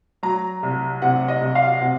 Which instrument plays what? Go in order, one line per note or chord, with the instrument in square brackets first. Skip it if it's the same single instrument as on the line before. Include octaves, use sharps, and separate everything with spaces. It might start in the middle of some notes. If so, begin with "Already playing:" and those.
[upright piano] F#3 A#5
C2
C3 F#5
D#5
C2
F5
C3 F#5